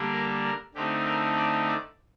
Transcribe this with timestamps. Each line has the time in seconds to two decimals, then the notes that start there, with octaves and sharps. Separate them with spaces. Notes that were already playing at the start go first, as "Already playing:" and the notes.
Already playing: D3 G3 A#3 D4
0.13 A#4
0.44 A#4
0.75 D3 A3 C4 D#4 G4
1.05 A#4
1.37 D5
1.68 D5